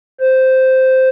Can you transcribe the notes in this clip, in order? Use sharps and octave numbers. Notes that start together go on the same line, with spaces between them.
C5